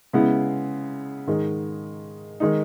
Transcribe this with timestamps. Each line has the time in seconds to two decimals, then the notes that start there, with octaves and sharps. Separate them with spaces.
0.13 C#3 G#3 B3 E4
1.27 G#2 D#3 G#3 D#4
2.40 D#3 G#3 D#4